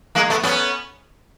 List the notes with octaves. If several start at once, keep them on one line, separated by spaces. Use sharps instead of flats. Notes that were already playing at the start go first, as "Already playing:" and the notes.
G#3 A#3
A3 B3
B3 C#4